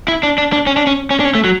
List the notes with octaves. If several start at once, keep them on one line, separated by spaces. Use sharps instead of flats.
E4
D4
D4
D4
C#4
D4
C#4
C#4
D4
C#4
A3
F#3